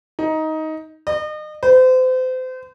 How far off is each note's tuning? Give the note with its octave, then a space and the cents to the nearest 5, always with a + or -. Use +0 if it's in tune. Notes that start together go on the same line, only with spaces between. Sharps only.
D#4 +15
D#5 -35
C5 -35